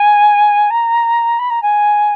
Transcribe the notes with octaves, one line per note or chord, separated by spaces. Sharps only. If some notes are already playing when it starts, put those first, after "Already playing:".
Already playing: G#5
A#5
B5
A#5
G#5